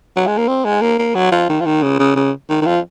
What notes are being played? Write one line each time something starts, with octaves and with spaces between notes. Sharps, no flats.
F#3
G#3
A#3
C4
G#3
A#3
A#3
F#3
F3
D#3
F3
D#3
C#3
C#3
C#3
D#3
D#3
F3